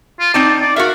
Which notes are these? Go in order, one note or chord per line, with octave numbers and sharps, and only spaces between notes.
F4
C4 D#4 D5 A5
D5
F#4 A#4 E5 F5